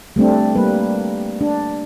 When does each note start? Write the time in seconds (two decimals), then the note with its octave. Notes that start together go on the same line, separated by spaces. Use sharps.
0.16 G3 A3 C4 D4
0.55 G3 A#3 B4
1.41 D4